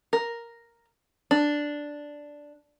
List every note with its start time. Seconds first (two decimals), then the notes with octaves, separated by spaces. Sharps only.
0.13 A#4
1.31 D4